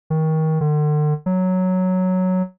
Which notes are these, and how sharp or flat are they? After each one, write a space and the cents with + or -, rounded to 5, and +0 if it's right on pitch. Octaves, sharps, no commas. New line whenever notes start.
D#3 +25
D3 +40
F#3 +0